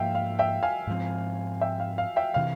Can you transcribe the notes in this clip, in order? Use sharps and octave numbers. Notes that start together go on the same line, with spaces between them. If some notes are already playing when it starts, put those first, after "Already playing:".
Already playing: G#2 F3 A#3 E5 F5 G5
F5
E5 G5
F5 G#5
G#2 F3 C4
E5 G5
F5
F5
E5 G5
C3 E3 F5